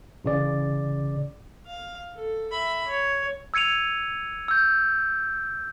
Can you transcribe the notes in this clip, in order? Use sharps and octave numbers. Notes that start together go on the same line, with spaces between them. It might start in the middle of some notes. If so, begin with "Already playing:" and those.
A1 C#3 D5
F5
A4
E5 B5
C#5
E6 G#6 C#7 D#7 F7
E6 G6